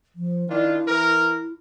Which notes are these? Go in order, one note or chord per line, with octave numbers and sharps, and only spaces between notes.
F3
D#3 D4 E4 F4
E3 A#4